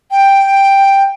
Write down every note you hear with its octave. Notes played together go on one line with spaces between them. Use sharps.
G5